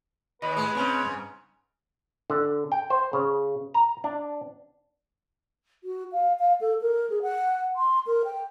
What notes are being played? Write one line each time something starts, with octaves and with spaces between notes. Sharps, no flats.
D#2 B4 D#5 B5
A2 G#3 B3
G#2 C#3 C4 C#4
D2 G2
D3
G5
C5
C#3
A#5
D4
F#4
F5
F5
A4
A#4
G#4
F#5
C6
A#4
G5